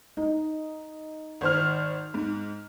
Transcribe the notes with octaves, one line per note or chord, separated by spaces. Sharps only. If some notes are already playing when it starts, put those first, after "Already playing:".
D#4
G#1 C5 F6
G#2